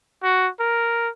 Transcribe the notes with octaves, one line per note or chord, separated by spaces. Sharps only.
F#4
A#4